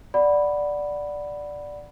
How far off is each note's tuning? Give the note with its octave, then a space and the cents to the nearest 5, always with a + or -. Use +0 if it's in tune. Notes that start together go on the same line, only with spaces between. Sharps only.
D5 +0 F#5 +0 B5 +0